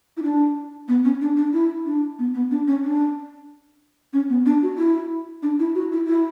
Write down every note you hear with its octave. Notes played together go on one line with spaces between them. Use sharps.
E4
D4
B3
C#4
D4
D4
E4
D4
B3
B3
D4
C#4
D4
C#4
B3
D4
F#4
E4
D4
E4
F#4
E4
E4